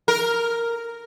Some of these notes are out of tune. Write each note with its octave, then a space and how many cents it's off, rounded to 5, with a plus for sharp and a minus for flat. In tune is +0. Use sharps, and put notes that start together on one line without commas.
A#4 -5